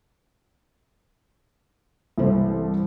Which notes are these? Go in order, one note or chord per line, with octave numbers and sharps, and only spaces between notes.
C2 E3 E4 A4 C5